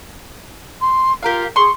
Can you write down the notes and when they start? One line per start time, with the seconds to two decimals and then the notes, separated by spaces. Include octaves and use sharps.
0.81 C6
1.23 F4 G4 A#4 F5
1.56 G#4 C6 C#6